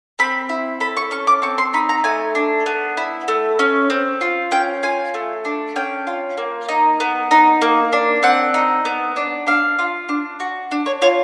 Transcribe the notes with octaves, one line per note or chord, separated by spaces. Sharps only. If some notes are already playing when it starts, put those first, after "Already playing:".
C4 B5
E4
A4 B5
C#6
C#4 C#6
D6
C4 C#6
C6
D#4 B5
A#5
A3 G#5
D4
B3
E4
A3
C#4
C4
F4
C#4 G5
F4 G#5
A3
D4
C#4 G5
F4
A#3
D#4
B3
D#4
A#3
D4
C4 F#5
D#4
B3
D4
D4 F5
F4
D4
F#4
D4
C#5
F4 C#5